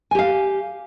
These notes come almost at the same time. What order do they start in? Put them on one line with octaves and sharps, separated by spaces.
G#5 G4 F5